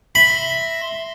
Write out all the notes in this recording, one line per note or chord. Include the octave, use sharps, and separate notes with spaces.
E5 B5 C6 A#6